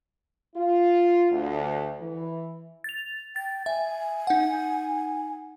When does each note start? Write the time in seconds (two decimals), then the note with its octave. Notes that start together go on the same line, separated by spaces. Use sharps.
0.55 F4
1.31 D2
2.00 E3
2.84 A6 F7
3.36 G5 A6
3.66 E5 G#5
4.27 D#4 F#5